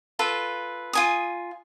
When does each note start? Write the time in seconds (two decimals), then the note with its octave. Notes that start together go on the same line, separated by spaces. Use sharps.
0.19 F4 A4 B4
0.93 F4 G#5 D#6